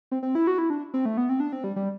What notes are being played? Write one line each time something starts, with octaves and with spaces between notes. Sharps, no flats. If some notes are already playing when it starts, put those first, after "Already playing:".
C4
C4
E4
F#4
E4
D4
C4
A3
B3
C4
D4
C4
G3
G3